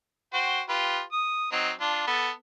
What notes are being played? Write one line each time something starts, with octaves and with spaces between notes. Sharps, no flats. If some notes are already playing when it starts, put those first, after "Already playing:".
F#4 C5 G5
F4 G4 B4
D#6
F#3 C4 D#4
D4 F4
B3 A4